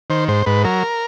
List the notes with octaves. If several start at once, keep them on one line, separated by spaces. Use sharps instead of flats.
D#3 C5
G#2 C5
G#2 B4
F#3 A#4